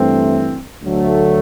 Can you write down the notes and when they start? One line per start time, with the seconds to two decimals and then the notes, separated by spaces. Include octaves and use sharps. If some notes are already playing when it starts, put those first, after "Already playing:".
Already playing: G2 E3 A3 C4
0.82 D2 D3 F#3 A3